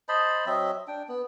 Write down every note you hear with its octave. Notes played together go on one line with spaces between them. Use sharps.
C5 D#5 A5 B5
F#3 C4 D#5 E5
D4 G5
B3